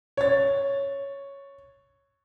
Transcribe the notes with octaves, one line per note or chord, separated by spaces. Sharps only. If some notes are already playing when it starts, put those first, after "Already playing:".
C#5 A6